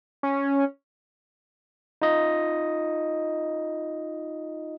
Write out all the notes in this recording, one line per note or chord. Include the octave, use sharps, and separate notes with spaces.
C#4
D#4 F4 D#5